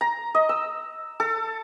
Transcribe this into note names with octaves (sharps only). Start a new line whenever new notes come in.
A#5
D#5
E6
A4